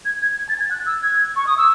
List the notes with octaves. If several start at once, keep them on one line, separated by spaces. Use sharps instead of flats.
G#6
G#6
G#6
A6
G#6
F#6
E6
G#6
C#6
D#6
E6